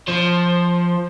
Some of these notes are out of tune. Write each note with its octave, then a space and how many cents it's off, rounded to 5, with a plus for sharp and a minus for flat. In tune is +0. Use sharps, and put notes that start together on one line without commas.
F3 +0 C5 +20